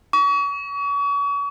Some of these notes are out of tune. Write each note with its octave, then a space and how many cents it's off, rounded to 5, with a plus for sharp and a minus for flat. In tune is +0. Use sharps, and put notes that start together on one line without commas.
C#6 +35